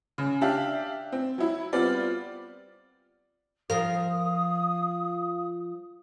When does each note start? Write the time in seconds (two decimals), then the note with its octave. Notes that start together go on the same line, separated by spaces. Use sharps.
0.18 C#3
0.41 D4 G4 E5 F5
1.12 C4
1.38 F#3 E4
1.73 G3 B3 C4 F4 D5
3.70 F3 A#4 F5 D#6